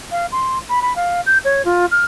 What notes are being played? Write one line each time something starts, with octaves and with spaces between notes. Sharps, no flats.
F5
C6
B5
B5
F5
G6
C#5
F4
F6